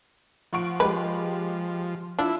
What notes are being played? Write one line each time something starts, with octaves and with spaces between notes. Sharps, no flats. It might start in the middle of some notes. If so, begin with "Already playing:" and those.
F3 F#5 C#6 D7
G#3 G4 B4
D4 E4 F4